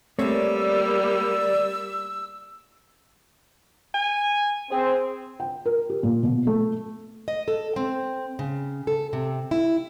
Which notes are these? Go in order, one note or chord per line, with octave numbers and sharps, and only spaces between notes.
G3 A3 A#3 C4 C#5 D5 E6
G#5
C4 G#4
G5
A#4
G4
A#2
B2
A3
D#5
A4
C4
C#3
A4
C3
E4